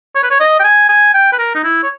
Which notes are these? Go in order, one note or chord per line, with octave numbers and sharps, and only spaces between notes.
C#5
B4
C#5
D#5
G5
G#5
G#5
G5
B4
A#4
D#4
E4
C#5